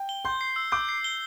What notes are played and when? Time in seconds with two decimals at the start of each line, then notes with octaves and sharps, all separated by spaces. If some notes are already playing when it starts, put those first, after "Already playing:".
Already playing: G5
0.09 G7
0.25 C6 G6
0.41 C7
0.56 E6
0.72 D6 G6
0.89 C7
1.04 G7